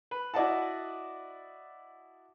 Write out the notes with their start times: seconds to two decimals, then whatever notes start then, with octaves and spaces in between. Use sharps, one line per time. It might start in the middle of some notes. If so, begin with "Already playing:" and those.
0.11 B4
0.34 E4 F#4 D5 D#5 F#5 A5